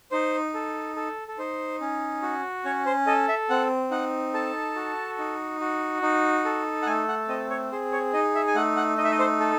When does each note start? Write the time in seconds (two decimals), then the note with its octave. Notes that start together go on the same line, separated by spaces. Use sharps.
0.11 D#4 C5
0.54 A4
0.96 A4
1.28 A4
1.38 D#4 C5
1.81 C#4
2.22 F#4
2.65 C#4 C#5
2.86 C5
3.07 A4 D#5
3.29 E5
3.50 C4 F#5
3.91 D#4 F#5
4.34 A4 A5
4.76 F#4
5.18 D#4
5.60 F#4
6.02 D#4
6.45 A4
6.82 F#5
6.86 A3 G#5
7.08 F#5
7.28 C4 D#5
7.50 C#5
7.71 G#4 C5
7.92 C#5
8.14 D#4 D#5
8.35 E5
8.47 G#5
8.55 A3 F#5
8.76 F#5
8.98 D#4 D#5
9.04 E5
9.12 D#5
9.19 C5
9.40 A4